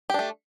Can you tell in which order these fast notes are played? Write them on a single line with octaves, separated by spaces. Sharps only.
G4 D4 A3